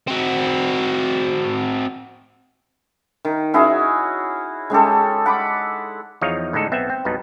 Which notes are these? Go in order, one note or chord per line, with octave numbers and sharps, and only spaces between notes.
C4 F#4
D#3
C#4 E4 F#4 G#4
G#3 C#4 G4 A4
F#5 B5 D6
E2 F3 D#4 G#4 C#5 F5
A2 D3 G#3 D#4 A4
B1 B3 C4 E5
C4
B1 G2 B2 B3 D#4